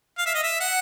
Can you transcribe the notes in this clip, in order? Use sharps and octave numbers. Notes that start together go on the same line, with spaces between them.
F5
E5
D#5
E5
F#5